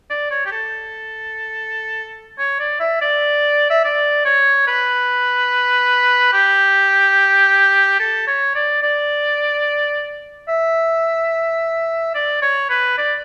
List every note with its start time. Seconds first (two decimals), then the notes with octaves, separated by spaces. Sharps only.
0.10 D5
0.31 C#5
0.46 G4
0.52 A4
2.38 C#5
2.60 D5
2.80 E5
3.01 D5
3.70 E5
3.84 D5
4.25 C#5
4.67 B4
6.33 G4
8.00 A4
8.28 C#5
8.55 D5
8.82 D5
10.48 E5
12.15 D5
12.42 C#5
12.70 B4
12.98 D5